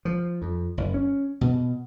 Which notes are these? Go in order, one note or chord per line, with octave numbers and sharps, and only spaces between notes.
F3
F2
F#1
C#4
B2